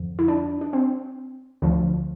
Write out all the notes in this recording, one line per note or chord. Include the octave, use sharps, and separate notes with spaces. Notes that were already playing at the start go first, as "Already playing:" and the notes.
Already playing: F2 D3 F3
E4
D4
D4
C4
D2 D3 F3